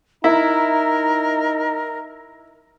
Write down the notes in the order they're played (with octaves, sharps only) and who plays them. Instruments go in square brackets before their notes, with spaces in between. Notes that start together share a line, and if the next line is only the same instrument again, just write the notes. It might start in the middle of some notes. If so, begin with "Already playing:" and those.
[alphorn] D#4 [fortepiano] E4 [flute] A#4 [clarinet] A#5